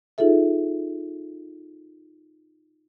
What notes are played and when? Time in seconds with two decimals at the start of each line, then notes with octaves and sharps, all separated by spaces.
0.18 D#4 F4 G#4 A4 E5